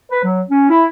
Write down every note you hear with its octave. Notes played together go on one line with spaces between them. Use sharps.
B4
F#3
C#4
E4